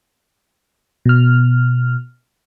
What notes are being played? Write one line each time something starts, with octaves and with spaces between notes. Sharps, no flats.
B2 F6